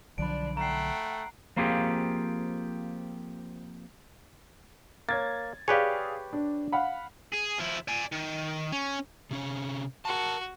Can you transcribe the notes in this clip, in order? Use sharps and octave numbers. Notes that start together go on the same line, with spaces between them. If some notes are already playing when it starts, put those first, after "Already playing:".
B1 D3 F3 F#3 D4 D5 B5 D7
A3 F#5 G5 A#5 C7
F3 A#3 C4 F4 G4 G#4
A#3 C#5 G#6 A6
G4 G#4 B4 C#5 D5 F5
D4
F5 F#5 B5
G#4
F3 E4
D5 G#5
D#3
C#4
C3 C#4 C#5
F#4 A#4 A5